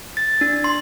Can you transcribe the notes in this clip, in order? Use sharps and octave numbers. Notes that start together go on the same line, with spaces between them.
A6
D4
C6